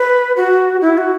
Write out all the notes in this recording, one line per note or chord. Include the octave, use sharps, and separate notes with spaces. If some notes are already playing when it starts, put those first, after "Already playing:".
Already playing: B4
F#4
E4
F#4